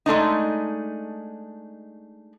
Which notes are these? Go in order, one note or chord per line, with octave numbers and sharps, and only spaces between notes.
G#3 A3 D4 D#4